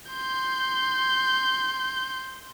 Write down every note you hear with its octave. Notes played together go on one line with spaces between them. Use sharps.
C6 G6